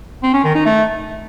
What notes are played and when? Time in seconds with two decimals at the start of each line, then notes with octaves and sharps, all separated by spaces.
0.23 C4
0.33 C#4
0.44 D#3
0.55 D#4
0.65 A3